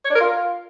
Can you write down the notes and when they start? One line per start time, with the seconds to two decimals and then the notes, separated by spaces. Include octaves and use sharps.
0.05 C#5
0.10 D4
0.15 A#4
0.20 F4